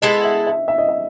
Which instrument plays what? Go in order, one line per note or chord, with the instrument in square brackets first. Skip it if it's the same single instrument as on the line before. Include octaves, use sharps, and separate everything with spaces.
[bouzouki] G#3 B3 E4 A4 [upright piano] D#5
[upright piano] E5
E5
E5
D#5
E5